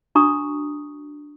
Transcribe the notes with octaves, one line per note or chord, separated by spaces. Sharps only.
D4 F#4 A#5 C#6 D#6